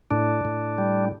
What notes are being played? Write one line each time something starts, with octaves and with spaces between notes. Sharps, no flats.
A2 D4
A2
G3